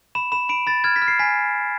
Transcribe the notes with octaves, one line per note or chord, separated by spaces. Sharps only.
B5 E7
B5 E7
B5 D7
B5 A6
F6 G#6
B6
F6
C7
G#5 B6